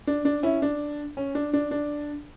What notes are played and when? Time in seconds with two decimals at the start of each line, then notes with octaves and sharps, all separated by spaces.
0.07 D4
0.25 D4
0.43 C#4 E4
0.62 D4
1.17 C#4
1.35 D4
1.53 D4
1.71 D4